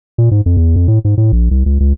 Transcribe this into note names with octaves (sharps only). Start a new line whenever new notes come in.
A#2
G#2
F2
E2
F2
A2
G#2
A2
A#1
C2
C#2
C#2